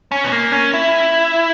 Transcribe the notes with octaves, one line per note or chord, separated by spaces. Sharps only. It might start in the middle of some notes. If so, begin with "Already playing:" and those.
C#4
B3
A#3
C#4
E4